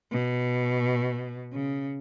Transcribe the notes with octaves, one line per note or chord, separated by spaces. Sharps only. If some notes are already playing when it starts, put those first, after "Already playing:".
B2
C#3